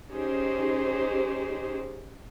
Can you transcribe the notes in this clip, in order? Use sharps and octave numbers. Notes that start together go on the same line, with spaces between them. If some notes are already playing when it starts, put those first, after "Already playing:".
C#4 D#4 G4 G#4 C5